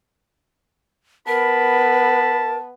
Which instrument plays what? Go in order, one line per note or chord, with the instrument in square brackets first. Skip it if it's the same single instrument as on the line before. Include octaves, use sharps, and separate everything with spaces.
[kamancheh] B3 [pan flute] A#4 [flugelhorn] A5 [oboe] B5